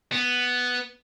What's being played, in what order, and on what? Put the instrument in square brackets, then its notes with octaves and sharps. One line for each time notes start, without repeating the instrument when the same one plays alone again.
[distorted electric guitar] B3